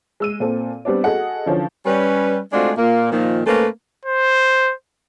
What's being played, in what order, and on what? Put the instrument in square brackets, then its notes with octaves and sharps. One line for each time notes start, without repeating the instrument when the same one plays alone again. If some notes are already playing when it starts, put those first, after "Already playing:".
[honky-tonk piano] G#3 E6 D#7
A#2 C4 A4
G3 B3 C4 D4 D5
F#4 G#4 A4 D#5 F#5
D3 E3 F3 C#4
[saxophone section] G3 C#4 B4
G#3 A3 C4 D4 F4 F#4
A#2 A#3
A#2 D#3 F3
G#2 A3 A#3 C#4 B4 C5
[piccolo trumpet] C5